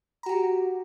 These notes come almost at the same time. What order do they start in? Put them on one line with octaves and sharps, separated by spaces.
A#5 F#4 G4